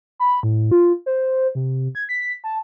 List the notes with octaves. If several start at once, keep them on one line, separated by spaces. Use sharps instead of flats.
B5
A2
F4
C5
C3
G#6
B6
A5